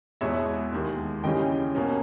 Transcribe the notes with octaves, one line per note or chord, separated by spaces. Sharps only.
E2 B2 G#3 B3 C#5 E5
D#2 D#3 G#3
D#2 C#3 E3 G3 C#4 D#5 G5
B2 A#3 C#4